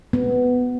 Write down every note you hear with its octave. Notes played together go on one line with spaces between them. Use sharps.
B3